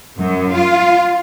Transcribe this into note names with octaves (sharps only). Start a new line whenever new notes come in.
F#2
F4